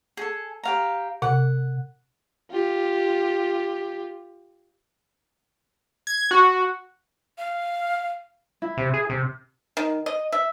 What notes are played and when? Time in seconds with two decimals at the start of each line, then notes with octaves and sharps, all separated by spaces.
0.17 G#4 A4
0.64 G4 F5 A#5
1.22 C3 F#5
2.51 F4 G4
6.07 G#6
6.31 F#4
7.38 F5
8.62 E4
8.77 C3
8.94 G#4
9.09 C3
9.77 D#3
10.06 D#5
10.32 E5